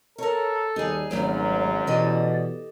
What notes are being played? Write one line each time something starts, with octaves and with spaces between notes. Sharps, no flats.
A4 A#4 C#5
D#2 G3 D#4 G#4
G#1 F#2 C#3 F#3 G3 A3
B2 E3 G4 A4 D5 D#5